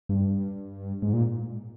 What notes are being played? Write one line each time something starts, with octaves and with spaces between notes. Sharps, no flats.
G2
G#2
A#2